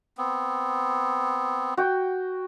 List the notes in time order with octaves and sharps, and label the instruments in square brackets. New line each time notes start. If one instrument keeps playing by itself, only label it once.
[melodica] B3 C4
[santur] F#4 G5